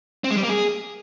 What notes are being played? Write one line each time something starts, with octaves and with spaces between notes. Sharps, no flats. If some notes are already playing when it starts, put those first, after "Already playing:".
C4
G#3
G3
A#3
G#4